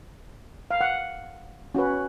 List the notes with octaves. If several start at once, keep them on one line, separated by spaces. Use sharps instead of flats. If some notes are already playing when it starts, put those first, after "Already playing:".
F5
F#5
C#4 F#4 B4